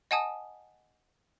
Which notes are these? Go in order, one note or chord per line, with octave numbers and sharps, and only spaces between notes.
D#5 F#5 G#5 A5 D#6